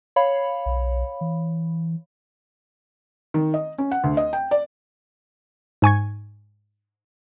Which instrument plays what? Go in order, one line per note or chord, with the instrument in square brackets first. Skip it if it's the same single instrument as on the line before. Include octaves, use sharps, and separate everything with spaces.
[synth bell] C#5 F5 B5
[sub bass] B1
E3
[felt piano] D#3
D#5
C#4
F#5
D2
D#5
G5
D5
[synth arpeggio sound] G#2 G#5 C#6 G#6